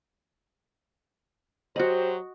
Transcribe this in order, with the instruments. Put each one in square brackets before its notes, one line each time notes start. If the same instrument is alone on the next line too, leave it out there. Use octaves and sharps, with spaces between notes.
[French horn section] F#3 G4 C5 [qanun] F#4 D#5